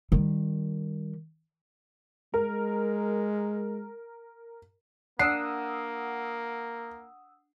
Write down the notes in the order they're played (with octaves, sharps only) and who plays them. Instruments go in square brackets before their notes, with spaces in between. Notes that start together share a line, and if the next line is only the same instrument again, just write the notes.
[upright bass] D#3 G3
[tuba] G#3 [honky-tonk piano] A#4
[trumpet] A#3 [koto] D4 [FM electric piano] F#5 D#6 E6 [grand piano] C7